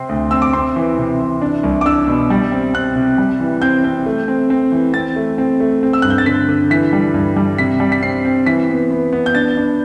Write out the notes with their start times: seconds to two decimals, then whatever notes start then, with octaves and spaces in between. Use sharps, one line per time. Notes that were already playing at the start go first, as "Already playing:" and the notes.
Already playing: C3 C4 C6
0.09 D2
0.31 C4 E6
0.42 D6
0.53 C4 C6
0.76 E3
0.98 C3
1.20 E3
1.41 D4
1.63 C2
1.81 D6
1.85 D4 E6
2.08 B2
2.30 G3
2.52 C4
2.74 C4 F#6
2.96 C3
3.18 G3
3.40 E3
3.62 C4 G6
3.84 C4
4.06 A3
4.28 C4
4.50 C4
4.72 E3
4.94 C4 A6
5.16 A3
5.38 C4
5.60 A3
5.83 C4
5.93 E6
6.02 G2 F#6
6.10 G6
6.18 A6
6.26 D3 B6
6.49 D3
6.70 E3 B6
6.93 G3
7.14 G2
7.37 G3
7.58 C3 B6
7.80 G3
7.92 B6
8.02 C4 C7
8.25 C4
8.46 E3 B6
8.69 B3
8.90 B3
9.13 B3
9.26 G6
9.35 D4 A6
9.57 D4